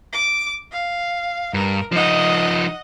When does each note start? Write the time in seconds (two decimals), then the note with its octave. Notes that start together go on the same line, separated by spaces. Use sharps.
0.13 D6
0.72 F5
1.54 G2 A#4
1.92 F3 D#4 D#5 F#5